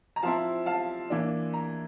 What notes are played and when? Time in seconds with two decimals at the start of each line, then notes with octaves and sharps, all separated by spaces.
0.16 A#5
0.23 F3 C4 E4 F5 A5
0.66 F5 A5
1.10 E3 A#3 D4
1.54 A#5